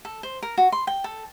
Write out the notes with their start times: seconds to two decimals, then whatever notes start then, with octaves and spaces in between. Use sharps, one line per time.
0.05 A4
0.23 C5
0.42 A#4
0.58 F#4
0.72 C6
0.87 G5
1.04 A4